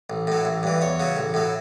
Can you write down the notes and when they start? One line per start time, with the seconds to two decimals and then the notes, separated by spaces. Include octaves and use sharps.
0.10 A1
0.27 A2 F#3
0.45 A1
0.63 G2 E3
0.81 E2 C#5
1.00 C#3 F#3
1.16 A1
1.34 A2 F#3